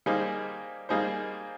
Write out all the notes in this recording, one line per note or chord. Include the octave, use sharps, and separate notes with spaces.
G3 A#3 D#4 G#4 C5
G3 A#3 D#4 G#4 C5